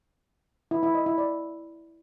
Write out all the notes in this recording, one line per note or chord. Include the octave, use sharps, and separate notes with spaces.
E4
E4
D#5
E4
D5